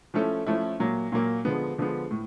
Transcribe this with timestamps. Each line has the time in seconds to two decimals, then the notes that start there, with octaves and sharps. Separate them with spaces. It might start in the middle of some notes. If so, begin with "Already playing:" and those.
0.14 F3 A3 C#4 E4 A4
0.47 F3 A3 C#4 E4 A4
0.80 A#2 F#3 A#3
1.12 A#2 F#3 A#3
1.45 D3 F3 G#3 B3
1.78 D3 F3 G#3 B3
2.11 A2